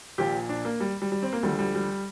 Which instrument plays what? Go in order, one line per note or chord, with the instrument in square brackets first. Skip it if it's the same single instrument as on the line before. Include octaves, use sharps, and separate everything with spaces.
[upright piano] A#1 A#2 F3 G4
D4
A#3
G3
G3
G3
C4
A#3
D2 D3 F3 G3
G3
G3